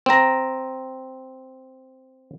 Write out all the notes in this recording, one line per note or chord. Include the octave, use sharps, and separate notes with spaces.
C4 A#5